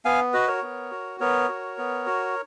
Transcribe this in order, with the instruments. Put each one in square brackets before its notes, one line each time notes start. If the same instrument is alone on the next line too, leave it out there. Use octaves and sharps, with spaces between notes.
[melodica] B3 F5 G#5
F#4 B4 D#5
A#4 C#5
B3
F#4
B3 A#4 C#5
F#4
B3
F#4